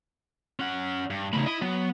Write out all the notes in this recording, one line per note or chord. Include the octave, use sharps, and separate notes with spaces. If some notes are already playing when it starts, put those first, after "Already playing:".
C#4 F#5
G2
A2 C#3 D#4 B5
E4 D#5
F#3 B3